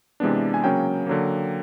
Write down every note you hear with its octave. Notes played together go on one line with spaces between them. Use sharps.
C3 E3 G#3 B3 D4
G#5
C#3 F#3 A#3 C#4 G5
D3 F#3 A#3